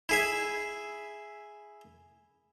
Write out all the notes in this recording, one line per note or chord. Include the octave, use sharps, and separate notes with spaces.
E4 G#4 E5